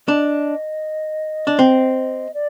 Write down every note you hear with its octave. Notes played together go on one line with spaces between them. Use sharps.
D4 D#5
D4
C4
D5